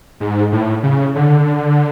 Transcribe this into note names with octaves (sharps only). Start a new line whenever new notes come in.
G#2
A2
C#3
D3